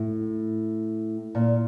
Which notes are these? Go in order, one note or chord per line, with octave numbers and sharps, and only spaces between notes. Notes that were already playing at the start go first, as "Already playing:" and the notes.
Already playing: A2
A#2